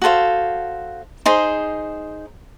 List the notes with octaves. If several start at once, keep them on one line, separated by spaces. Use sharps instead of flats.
F#4 A4 C5 F5
D#4 G#4 C5